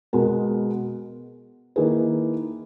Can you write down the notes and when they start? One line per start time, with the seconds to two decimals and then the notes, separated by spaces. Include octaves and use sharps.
0.13 B2 G#3 B3 F#4 A#4
1.76 D#3 A#3 E4 G#4 B4